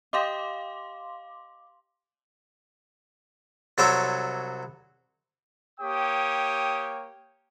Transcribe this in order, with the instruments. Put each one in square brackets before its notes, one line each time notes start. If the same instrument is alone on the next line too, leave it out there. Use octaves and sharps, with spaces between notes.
[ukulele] G4 D#5 [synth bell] F5 C6 D6
[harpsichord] C2 F#3 A4 C5 C#5 D6
[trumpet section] A#3 G4 C#5 G5 D#6